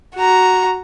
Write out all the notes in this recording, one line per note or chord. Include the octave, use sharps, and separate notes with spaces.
F#4 A#5